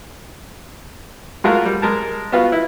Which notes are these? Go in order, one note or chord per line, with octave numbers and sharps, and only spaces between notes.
G#3 A3 F4 F#4 A#4
G3
G#3 A#4 A5
B3 F4 F#4
E4